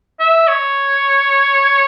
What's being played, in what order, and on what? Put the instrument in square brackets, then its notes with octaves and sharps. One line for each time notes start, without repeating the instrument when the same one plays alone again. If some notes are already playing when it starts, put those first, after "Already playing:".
[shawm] E5
C#5